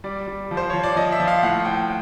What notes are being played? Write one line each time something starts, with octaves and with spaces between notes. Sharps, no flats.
G3 D5
G3
F3
C5
F3 C#5
D5
F3 D#5
E5
F3
F5
A2 F#5
A2 G5